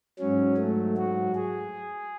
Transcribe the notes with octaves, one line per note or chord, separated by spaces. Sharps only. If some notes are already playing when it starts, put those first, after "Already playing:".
G#2 F#3 C#4
A3
F#4
G#4